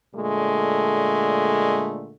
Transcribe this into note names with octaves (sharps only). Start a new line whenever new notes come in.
A#2 D3 G#3 A3